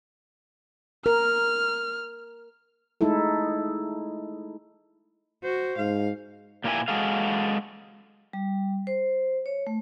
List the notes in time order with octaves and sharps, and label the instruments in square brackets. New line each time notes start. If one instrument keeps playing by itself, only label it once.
[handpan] A#4 [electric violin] F6
[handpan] G#3 A3 D#4 E4 A4
[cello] F#4 [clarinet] C5
[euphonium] G#2 [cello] F5
[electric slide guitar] A#2 A#3 E4 G4 G#5
G#3 F#4 G#4 A4 F5
[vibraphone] G3
C5
C#5
A3